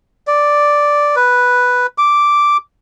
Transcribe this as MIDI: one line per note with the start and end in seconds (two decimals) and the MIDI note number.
0.27 1.16 74
1.16 1.87 71
1.98 2.57 86